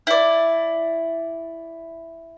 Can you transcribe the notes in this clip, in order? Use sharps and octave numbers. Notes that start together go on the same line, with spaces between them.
E4 D5